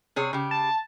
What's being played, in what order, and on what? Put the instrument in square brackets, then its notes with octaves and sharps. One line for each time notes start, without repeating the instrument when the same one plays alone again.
[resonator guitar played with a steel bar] C3 G#4 C#5
C#3 G4
[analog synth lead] A5